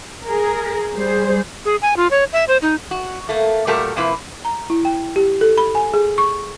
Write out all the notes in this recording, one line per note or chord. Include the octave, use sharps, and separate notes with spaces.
G#4 A#4
G3 G#4 C5
G#4
G#5
F4
C#5
E5
C5
D#4
F#4
A3 A#3
A#2 G3 A3 F#4 A4 A#4
C3 F3 A#3 E4 B4
A#5
E4
G5
G4
A4
B5
G#5
G#4
C#6